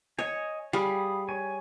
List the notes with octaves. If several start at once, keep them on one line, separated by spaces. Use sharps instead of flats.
C#5 D#5 G#5
G3 G#4 F5 B5 D#6
C#5 G#5